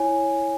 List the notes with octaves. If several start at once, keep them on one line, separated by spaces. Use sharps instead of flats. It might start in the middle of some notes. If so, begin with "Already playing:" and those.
Already playing: E4 C#5 G#5